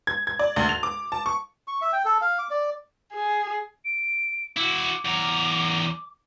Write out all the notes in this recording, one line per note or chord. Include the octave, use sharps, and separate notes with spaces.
G#6
G#6
D5
D2
F7
D6
A5
C#6
C#6
E5
G5
A4
F5
D6
D5
G#4
D7
E4 F#4 D6
E2 A#4